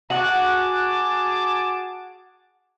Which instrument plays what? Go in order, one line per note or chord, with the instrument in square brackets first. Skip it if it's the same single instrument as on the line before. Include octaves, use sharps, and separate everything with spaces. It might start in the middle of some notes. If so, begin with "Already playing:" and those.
[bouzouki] F#4 [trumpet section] G#4 A5 D6